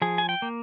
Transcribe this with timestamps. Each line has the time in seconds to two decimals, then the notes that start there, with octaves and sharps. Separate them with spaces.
0.02 F3 G#4
0.18 G#5
0.29 G5
0.42 A#3